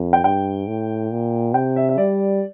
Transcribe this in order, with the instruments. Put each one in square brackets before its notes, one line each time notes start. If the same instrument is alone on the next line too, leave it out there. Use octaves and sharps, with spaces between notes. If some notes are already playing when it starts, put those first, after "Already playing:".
Already playing: [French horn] F2
[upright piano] G5
[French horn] G2 [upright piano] G5
[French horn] A2
A#2
[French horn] C3 [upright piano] G5
[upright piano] E5
E5
[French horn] G3 [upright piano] D5